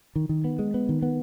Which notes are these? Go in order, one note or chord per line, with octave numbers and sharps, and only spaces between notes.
D#3
D#3
B3
G#3
B3
D#3
B3